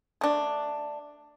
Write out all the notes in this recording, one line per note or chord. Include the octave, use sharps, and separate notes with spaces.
A3 D4